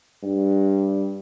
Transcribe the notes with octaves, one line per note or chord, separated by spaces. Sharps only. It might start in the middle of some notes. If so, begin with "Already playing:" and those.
G2